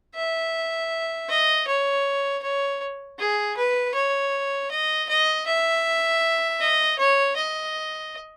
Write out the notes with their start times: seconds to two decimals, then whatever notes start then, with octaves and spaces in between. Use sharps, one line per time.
0.15 E5
1.29 D#5
1.67 C#5
2.43 C#5
3.19 G#4
3.57 B4
3.95 C#5
4.71 D#5
5.09 D#5
5.46 E5
6.61 D#5
6.98 C#5
7.37 D#5